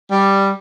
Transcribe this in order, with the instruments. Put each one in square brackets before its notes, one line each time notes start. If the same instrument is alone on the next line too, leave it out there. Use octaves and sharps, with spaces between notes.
[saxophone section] G3